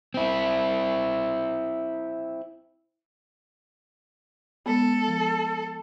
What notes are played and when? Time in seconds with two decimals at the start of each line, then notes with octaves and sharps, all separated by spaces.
0.14 C4 E4
4.66 G#3 B3 A4
5.08 F3